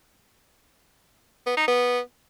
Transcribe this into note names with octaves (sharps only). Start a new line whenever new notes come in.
B3
D#4
B3